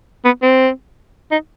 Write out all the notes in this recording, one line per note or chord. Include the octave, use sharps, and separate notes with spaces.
B3
C4
D#4